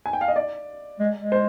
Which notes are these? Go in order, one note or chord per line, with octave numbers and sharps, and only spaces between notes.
G#5
G5
F5
D#5
D5
G#3
G#3
C5